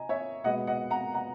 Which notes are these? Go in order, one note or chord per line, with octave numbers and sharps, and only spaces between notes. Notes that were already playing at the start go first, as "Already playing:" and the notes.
Already playing: D#5 G#5 A#5
C#5 E5
B2 G#3 B3 D#5 F#5
D#5 F#5
F#5 A#5
F#5 A#5